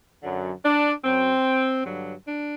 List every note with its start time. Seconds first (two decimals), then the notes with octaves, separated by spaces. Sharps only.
0.23 F#2 D3 F#3
0.64 D4
1.04 F#2 F#3 C4
1.85 G2 D3 F#3
2.26 D4